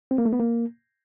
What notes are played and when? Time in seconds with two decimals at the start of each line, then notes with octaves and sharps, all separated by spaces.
0.11 C4
0.18 A#3
0.25 A3
0.33 B3
0.40 A#3